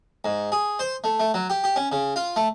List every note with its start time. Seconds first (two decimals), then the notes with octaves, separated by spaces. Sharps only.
0.25 G#2
0.52 G#4
0.79 C5
1.04 A3
1.20 A3
1.34 F#3
1.50 G4
1.64 G4
1.76 C#4
1.92 C#3
2.16 F4
2.36 A3